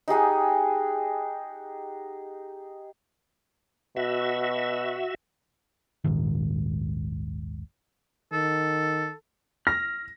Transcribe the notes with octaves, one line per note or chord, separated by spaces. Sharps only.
D#4 G4 G#4 F#5
B2 F#4 E5
D#1 A#1 G#2 D#3
D#3 A4
F6 A#6